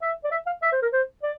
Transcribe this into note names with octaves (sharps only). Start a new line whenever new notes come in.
E5
D5
E5
F5
E5
C5
A#4
C5
D5